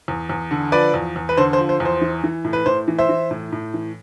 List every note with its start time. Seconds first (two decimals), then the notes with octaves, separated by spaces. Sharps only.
0.08 E2
0.30 E2
0.51 D3
0.72 F3 B4 D5
0.94 E2
1.16 E2
1.29 B4
1.37 D3 C5
1.53 C5
1.59 F3
1.69 C5
1.80 E2
1.85 C5
2.01 E3
2.24 E3
2.45 A2
2.53 B4
2.66 A2 C5
2.88 E3
2.98 C5 E5
3.09 E3
3.31 A2
3.52 A2
3.74 E3